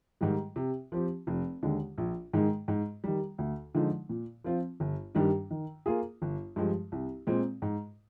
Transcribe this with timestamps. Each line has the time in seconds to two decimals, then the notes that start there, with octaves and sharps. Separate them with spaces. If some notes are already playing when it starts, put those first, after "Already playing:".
0.21 G#2 D#3 G3
0.56 C3
0.92 F3 C4 G4
1.27 F1
1.63 D#2 D3 G#3
1.98 A#1
2.33 G#2 D#3 G#3
2.68 G#2
3.04 D#3 G3
3.38 D2
3.75 D3 F3 G#3 D#4
4.09 A#2
4.44 F3 C4 F4
4.80 G1
5.15 G2 D#3 G3 D4
5.51 D#3
5.86 A#3 F4 G#4
6.22 G1
6.56 G2 F3 G#3
6.92 C2
7.27 A#2 G#3 C4
7.62 G#2